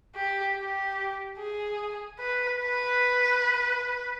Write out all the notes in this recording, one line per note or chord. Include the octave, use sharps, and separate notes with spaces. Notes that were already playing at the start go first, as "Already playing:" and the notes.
G4
G4
G#4
B4
B4